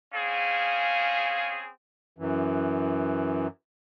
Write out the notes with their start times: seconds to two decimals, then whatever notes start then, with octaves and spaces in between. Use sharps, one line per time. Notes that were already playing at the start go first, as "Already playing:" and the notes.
0.14 C4 C#4 G#4 F5
2.18 F#2 E3